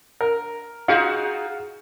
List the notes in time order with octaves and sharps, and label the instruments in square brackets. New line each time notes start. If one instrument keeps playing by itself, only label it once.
[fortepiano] A#4
[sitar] D#4 F#4 G#4 [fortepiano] F4